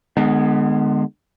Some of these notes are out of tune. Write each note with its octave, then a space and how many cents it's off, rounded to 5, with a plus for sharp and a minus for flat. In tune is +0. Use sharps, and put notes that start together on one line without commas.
D3 +45 G#3 +0 B3 +0